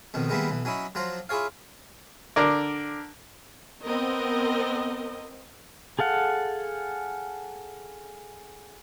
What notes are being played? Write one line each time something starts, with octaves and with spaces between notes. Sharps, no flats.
F2 B2 D#3
D#3 G3 G#3 A#3 B3 E4
B1 E3
F#3 C#4 D#4 E4
F3 F#3 F4 C5 A#5
E4 F4 G#4 C#5 F5
D3 A#4 D5
B3 C4 A#4 D#5
G#4 A4 F5 F#5